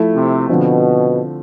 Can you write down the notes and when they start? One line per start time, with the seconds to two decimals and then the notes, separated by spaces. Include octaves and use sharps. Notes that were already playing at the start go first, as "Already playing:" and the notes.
Already playing: F3 A3 E4
0.16 C3
0.49 B2 D3 F3 C4